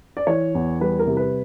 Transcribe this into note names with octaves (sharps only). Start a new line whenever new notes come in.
D5
E3 C#5
E2
G3 B4
A#4
C3
B4